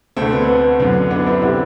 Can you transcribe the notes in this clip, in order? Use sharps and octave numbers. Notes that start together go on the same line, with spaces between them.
D2 D3 A3 C4
B3
B3
F#2 D3
B3 D4
C4 E4
D3 E4 G4